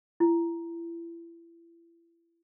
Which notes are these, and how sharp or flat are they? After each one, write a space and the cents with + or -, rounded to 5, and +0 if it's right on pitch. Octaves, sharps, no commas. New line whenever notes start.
E4 +30